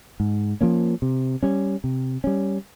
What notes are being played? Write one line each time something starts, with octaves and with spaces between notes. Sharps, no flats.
G#2
F3 A#3 C#4
C3
G3 C#4
C3
G3 C#4